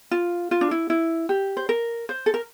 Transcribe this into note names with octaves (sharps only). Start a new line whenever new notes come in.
F4
F4
D4
E4
E4
G4
C5
A#4
C5
A4
A#4